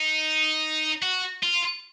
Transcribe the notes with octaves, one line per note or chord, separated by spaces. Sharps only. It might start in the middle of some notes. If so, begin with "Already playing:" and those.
Already playing: D#4
F#4
F4